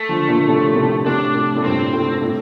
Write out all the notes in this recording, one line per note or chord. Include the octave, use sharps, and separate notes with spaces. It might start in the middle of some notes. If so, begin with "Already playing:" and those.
Already playing: A3
D3 F3
A#2 D3
A2 C3
A2 C3
A2 C3 D4
A2
A2
G2 A#2 C4
A2
A2